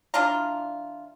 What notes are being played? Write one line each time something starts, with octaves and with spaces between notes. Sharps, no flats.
E3 D4 F4 A#5